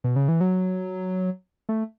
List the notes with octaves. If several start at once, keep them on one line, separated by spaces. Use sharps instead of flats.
B2
C#3
E3
F#3
A3